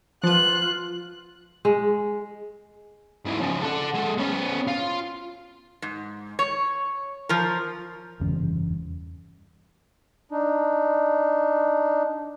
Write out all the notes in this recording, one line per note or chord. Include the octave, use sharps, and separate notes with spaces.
F3 F4 B4 F#6
G#3
G#2 E3
C#3 F3
A4 F#5
G#3 A4
B3 C#4
F4
G#2
C#5
F3 A#4
F1 E2 G2 C#3
D4 D#4